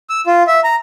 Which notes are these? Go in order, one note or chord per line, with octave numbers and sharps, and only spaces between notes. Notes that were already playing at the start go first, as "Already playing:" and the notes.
E6
F4
E5
A#5